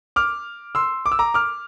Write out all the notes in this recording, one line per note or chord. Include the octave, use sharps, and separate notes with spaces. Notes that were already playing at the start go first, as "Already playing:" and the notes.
D6 F6
C6 E6
D6
E6
A#5 D6
D6 F6